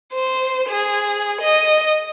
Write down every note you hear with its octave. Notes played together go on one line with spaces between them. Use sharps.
C5
G#4
D#5